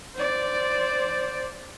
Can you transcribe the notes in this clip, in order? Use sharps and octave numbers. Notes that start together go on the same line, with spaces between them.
C5 D5